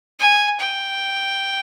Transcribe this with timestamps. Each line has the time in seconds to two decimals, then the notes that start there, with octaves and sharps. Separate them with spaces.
0.20 G#5
0.60 G5